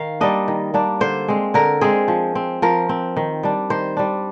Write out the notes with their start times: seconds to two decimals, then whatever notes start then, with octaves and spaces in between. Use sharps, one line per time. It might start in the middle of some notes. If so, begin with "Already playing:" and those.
Already playing: D#3 F5
0.21 G3 A#3 D4 D#5
0.48 D#3
0.74 G3 A#3 D4
1.00 D3 C5
1.28 G#3 C4
1.54 D3 A#4
1.81 G#3 C4 G#4
2.08 F3
2.35 C4
2.62 F3 A#4
2.89 C4
3.17 D#3
3.43 G3 D4
3.70 D#3 C5
3.97 G3 D4